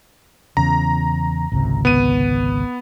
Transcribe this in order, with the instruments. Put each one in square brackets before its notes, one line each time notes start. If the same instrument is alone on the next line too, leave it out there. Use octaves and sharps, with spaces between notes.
[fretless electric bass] E2 C#3 [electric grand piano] A#5
[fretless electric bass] G#1 C#2 C3
[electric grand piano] B3 D#7